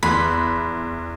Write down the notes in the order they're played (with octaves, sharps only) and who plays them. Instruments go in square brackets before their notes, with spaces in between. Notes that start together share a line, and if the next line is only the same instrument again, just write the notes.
[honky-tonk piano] E2 C6 F#6 [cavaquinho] B5